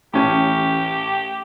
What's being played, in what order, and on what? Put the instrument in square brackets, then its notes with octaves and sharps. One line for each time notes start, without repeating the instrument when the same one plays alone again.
[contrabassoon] A1 [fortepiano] A2 C#4 [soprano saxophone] G4